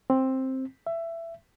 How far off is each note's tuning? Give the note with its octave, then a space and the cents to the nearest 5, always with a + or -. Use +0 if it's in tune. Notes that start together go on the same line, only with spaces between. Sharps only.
C4 +10
E5 +20